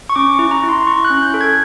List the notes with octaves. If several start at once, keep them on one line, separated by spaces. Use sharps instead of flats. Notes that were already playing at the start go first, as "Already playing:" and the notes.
C#6
C#4 D6
C#6
E4
A#5
E4
C6
E4 C#6
F#6
C#4
G6
A4
G#6